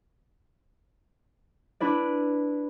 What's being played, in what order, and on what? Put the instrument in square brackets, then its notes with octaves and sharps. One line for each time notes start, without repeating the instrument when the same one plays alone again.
[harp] D4 E4 B4 D5